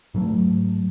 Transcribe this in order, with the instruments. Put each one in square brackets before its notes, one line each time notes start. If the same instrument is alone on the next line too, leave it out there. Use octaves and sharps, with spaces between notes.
[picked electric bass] G#2 F#3 A3